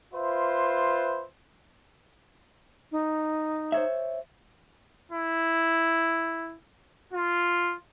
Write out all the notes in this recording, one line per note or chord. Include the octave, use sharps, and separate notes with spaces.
F4 B4 C5 E5
D#4
C5 C#5 E5
E4
F4